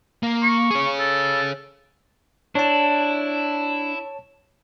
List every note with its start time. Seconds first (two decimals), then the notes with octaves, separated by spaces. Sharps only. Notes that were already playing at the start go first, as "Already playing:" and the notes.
0.23 A#3
0.42 C#6
0.71 G#4 C#5
0.99 A4
2.55 D4 E4 C#5 A5